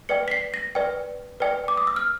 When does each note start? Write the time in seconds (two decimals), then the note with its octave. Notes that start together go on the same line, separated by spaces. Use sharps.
0.09 B4 D5 G5 C#7
0.28 B6
0.31 C7
0.54 A#6
0.75 B4 D5 G5
1.40 B4 D5 G5
1.68 D6
1.77 D#6
1.87 E6
1.96 F6